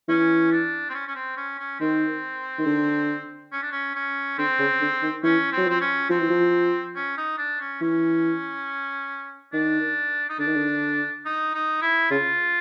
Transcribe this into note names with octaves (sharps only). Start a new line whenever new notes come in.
E3 C#4
D4
C4
C#4
C#4
C4
C#4
C#4
D#3 C4
D#3
D3
C#4
D4
C#4
C#4
D3 C4
C#3
D3
D#3
E3 C#4
C4
F#3
F3 C4
C#4
F3 C4
E3
F3
C#4
D#4
D4
C#4
E3 C#4
D#3 D4
D#4
D3 D4
D#3
D3
D#4
D#4
E4
C#3 F4